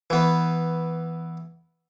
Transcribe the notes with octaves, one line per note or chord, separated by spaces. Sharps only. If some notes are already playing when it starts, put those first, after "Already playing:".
E3 B3